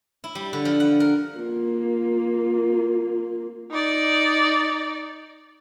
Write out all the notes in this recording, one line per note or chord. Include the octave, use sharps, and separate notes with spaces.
E4
G3
D3
F3
F#5
A#4
A#3 F4
D#4 D5